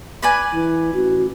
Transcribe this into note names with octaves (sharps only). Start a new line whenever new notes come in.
B4 D5 G#5
E3
A1 F#4